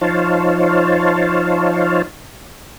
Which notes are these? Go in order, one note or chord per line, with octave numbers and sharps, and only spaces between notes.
F3 D#4 C5 C#5 F5 A5